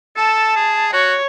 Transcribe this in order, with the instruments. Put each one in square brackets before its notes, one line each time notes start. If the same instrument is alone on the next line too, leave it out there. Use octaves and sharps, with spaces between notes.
[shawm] A4 [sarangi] A5
[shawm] G#4
[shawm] F#4 [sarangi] C#5